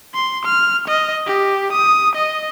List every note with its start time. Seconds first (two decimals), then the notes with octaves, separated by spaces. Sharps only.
0.14 C6
0.45 F6
0.88 D#5
1.26 G4
1.73 D#6
2.16 D#5